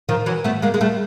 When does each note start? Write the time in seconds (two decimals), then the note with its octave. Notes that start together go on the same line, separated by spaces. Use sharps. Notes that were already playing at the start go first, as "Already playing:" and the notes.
0.09 D#3 F3
0.26 E3 F#3
0.44 A3 B3
0.62 G#3 A#3
0.74 G#3
0.81 G3 A3